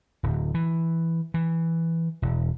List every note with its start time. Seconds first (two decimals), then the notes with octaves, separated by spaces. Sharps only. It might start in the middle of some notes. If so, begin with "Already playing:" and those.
0.23 D1
0.54 E3
1.34 E3
2.22 E1